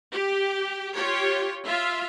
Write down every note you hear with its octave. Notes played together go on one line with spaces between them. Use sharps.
G4
F4 G4 C#5
F4 E5 F5